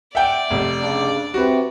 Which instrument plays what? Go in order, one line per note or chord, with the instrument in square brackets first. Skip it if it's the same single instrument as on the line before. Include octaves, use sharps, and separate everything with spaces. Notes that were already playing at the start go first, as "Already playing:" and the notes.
[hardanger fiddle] D5 [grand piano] E5 F#5 G5
[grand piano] F1
[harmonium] C#3 D4
[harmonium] C3 [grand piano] F#4 B4